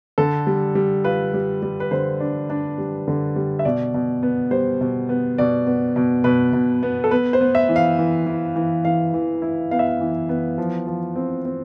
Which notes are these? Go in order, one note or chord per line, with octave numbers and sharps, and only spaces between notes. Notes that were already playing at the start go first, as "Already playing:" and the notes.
D3 A4
G3
G3
F4 B4
G3
G3
B4
D3 C5
D4
D4
G3
D3
G3
E5
B2 D5
B2
B3
G3 C5
B2
B3
B2 D5
B3
B2
B2 B4
B2
B3
A4
B3 B4
C5
B3
E5
E3
F5
E3
E3
E3
E3 F5
E3
E4
B3 F5
E5
F5
E3
B3
F3
F3
C4
C4